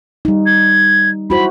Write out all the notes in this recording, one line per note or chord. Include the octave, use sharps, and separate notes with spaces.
G3 D#4
G#6
E4 F#4 C5 B5